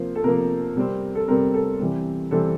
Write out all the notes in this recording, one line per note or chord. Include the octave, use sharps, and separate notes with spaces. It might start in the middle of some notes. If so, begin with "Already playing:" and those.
Already playing: C3 F3 A#3 C5
A4
C3 F3 A#3 A#4
C3 G3 C4
A4
C3 G3 C4 A#4
A4
C3 E3 G3 C4
C3 E3 G3 C4 A4